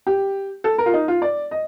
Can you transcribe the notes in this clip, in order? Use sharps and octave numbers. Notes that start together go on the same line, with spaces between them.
G4
A4
A#4
F4
D#4
F4
D5
D#5